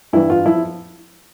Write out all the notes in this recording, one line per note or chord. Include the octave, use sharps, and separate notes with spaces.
G2 E3 E4
F4
F3 E4